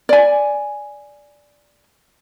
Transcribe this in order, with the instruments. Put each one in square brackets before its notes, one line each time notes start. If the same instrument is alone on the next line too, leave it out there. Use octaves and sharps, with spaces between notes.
[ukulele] D5 G#5